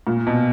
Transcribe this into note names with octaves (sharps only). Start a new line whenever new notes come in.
A#2
B2